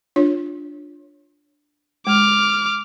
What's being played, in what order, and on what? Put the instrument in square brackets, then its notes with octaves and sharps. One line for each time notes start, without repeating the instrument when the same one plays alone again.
[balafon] D4 F4 C#5
[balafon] G#3 [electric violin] D6 F6